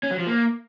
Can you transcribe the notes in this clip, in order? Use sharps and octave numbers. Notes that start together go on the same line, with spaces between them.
C#4
F#3
F3
A#3